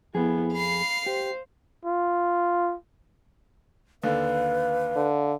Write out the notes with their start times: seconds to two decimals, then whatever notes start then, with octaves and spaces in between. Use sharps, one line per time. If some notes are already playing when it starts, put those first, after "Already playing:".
0.15 F2 B3 E4 G#4
0.53 F5 B5 C7
1.06 G4 C5
1.85 F4
4.03 D#2 D3 B4 F5
4.96 D3